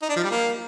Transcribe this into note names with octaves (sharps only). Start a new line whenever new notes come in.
D#4
D4
F3
G3
A#3